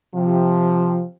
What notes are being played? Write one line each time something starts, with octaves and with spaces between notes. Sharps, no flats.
C3 F3